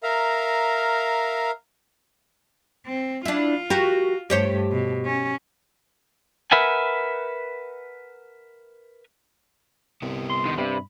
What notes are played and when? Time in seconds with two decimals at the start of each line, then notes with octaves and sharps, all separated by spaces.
0.03 A#4 E5 F5 A#5
2.86 C4
3.25 D4 E4 F4
3.70 F#4 G4 A#4
4.30 G2 A3 G4 C5 C#5
4.72 B2
5.06 C#4
6.52 A#4 B4 E5 F#5 G#5
10.02 C2 B3 G4
10.30 C6
10.46 D3 D#3
10.58 G2 C3 G3 B5